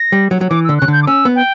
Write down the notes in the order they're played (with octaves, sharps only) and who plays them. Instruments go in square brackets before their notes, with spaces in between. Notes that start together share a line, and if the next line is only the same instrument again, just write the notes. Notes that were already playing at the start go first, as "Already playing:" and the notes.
Already playing: [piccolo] A#6
[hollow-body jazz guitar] G3
F#3
F#3
[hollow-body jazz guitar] E3 [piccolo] D6
[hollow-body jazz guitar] D3 [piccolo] E6
[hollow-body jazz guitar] C#3 [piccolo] F#6
[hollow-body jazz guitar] D3 [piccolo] G6
[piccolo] D6
[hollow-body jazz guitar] C#4 [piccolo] E6
[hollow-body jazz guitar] B3
[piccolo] G5